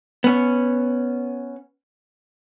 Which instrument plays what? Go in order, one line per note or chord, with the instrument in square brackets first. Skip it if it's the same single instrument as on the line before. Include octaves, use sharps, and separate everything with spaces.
[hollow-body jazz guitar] B3 C#4